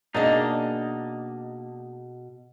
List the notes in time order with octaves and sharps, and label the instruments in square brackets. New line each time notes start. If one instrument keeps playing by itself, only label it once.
[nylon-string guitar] B2 G#4 D#5 [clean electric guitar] A#3 D4 D#4